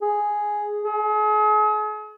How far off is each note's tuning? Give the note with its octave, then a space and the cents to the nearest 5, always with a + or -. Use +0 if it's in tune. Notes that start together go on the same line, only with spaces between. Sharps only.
G#4 +0
G#4 +40